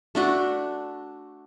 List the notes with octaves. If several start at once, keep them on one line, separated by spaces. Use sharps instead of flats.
A3 D4 F#4